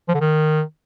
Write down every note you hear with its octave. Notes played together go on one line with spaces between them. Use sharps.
F3
D3
D#3